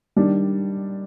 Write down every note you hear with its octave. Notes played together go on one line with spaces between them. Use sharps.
D#3 G3 D4